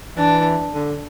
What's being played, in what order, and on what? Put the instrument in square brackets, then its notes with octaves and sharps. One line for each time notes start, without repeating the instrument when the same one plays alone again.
[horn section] E3 [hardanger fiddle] D4
[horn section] D3